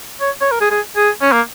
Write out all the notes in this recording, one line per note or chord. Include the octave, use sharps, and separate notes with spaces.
C#5
C#5
A#4
G#4
G#4
G#4
C#4
A#3